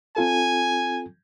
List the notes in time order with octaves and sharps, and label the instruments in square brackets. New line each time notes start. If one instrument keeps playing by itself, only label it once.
[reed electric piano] C4 F4 A4 [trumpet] G#5